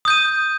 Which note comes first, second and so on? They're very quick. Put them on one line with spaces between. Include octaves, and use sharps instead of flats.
D#6 G6 D#7